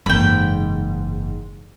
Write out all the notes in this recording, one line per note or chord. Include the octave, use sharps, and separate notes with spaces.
F#1 G#2 E3 G5 B5